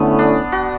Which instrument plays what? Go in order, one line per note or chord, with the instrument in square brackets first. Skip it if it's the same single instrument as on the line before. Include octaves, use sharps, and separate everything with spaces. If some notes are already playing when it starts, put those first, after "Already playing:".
Already playing: [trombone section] D3 A3 C#4 E4 [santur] B3
[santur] D4
F#4